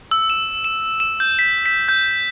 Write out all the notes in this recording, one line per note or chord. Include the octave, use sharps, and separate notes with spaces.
E6
E7
E7
E7
G6
B6
B6
G6